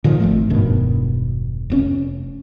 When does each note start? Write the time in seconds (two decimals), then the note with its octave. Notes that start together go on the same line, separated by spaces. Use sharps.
0.04 A#2 D3 D#3 F3
0.20 G#1 F3 A3
0.50 E1 G2 B2 D#3
1.70 F1 G#2 C#4